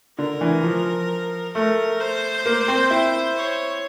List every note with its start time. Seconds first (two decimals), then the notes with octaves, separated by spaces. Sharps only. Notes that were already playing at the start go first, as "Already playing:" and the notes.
0.18 D3 A#4
0.41 E3
0.63 F3
1.54 A3 A#4
2.00 C5
2.46 A#3
2.68 C4
2.91 E4
3.36 C#5